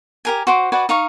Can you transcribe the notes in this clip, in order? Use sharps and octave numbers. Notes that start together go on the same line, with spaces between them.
G4 A#4 G#5
F#4 C5 D6
F#4 B4 D5 G#5
D#4 F5 C#6